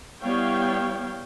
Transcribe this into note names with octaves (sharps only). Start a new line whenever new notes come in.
G3 B3 E4 C#5 F5 G5